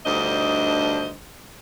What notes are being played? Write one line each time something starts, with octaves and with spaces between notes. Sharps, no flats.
D2 G2 D4 D#4 C5 D#5